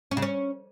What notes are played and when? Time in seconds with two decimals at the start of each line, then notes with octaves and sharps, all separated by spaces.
0.11 C#4
0.17 C#3
0.22 C#4